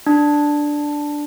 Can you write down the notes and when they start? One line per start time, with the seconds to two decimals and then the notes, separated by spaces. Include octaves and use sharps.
0.06 D4